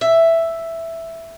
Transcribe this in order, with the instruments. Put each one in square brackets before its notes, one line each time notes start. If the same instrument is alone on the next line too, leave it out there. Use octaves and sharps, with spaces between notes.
[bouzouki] E5